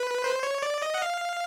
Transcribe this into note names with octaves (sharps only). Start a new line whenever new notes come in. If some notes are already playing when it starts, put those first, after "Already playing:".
Already playing: B4
C5
C#5
D5
D#5
F#5
F5